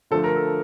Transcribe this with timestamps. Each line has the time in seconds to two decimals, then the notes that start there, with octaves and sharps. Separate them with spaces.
0.11 D3 F3 A3 A4
0.24 A#4
0.36 A4